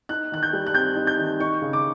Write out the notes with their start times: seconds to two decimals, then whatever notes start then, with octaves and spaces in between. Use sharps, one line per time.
0.09 D#4 F#6
0.32 D#3 F#6
0.43 G6
0.53 G3
0.66 F#6
0.75 C4 G6
0.96 D#4
1.07 G6
1.19 D#3
1.40 D#4 C#6
1.62 C#3
1.73 D6